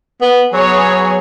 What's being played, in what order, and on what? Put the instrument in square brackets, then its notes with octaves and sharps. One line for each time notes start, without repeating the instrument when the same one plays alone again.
[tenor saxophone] B3
[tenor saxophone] F#3 [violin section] B3 G#4 C#5